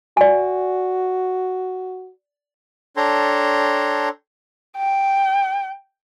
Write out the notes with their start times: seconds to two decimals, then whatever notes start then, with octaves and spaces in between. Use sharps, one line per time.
0.17 F#4 D5 G#5
2.97 D4 A4 C#5 G5 A#5 C6
4.77 G5